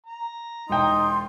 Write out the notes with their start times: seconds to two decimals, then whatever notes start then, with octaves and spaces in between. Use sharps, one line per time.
0.07 A#5
0.69 E1 D#4 G5 C6